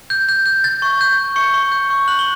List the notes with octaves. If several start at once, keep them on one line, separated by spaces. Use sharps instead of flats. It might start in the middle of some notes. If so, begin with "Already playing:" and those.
G6
G6
G6
G6 A6
C#6
G6
G6
C#6 C#7
C#6
G6
C#6
F#6 F#7
G7